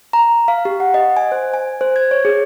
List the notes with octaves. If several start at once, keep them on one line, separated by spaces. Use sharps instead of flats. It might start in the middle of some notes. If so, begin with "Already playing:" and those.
A#5
F5
G4
F#5
D#5
G#5
C5
G#5
C5
G#6
C#5
G#4